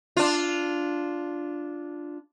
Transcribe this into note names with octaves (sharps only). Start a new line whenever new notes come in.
D4 F4